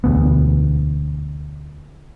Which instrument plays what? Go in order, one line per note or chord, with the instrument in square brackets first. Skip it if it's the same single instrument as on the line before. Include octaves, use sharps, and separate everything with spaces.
[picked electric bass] E1 D2 B3